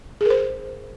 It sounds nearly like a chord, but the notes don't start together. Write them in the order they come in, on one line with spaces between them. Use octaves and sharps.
G#4 A#4 C5